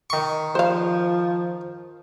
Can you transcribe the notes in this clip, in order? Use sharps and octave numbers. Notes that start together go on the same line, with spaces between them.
D#3 C#6
F3 C5 F5